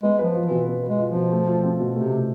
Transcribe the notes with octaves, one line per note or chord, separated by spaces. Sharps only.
G#3 B3
F3 B4
F4
E3
B2
B3
B4
G#3
F4
F3
B2
A3
F4
C4
B2
C3 A3
F4